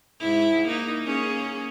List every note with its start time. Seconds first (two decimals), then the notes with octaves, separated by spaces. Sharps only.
0.19 G#2 E4
0.67 A#3 D#4
1.05 A#3 C#4 G#4